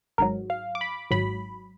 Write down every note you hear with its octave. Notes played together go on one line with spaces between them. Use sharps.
G#1 G#2 F#3 A#4
F5
D6
B5
G#1 G#2 F#3 B5